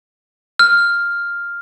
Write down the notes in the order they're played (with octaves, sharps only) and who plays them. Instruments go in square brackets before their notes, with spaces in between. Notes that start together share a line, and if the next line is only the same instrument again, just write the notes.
[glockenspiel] F6